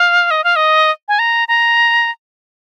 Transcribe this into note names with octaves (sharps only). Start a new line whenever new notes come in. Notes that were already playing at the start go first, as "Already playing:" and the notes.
Already playing: F5
D#5
F5
D#5
G#5
A#5
A#5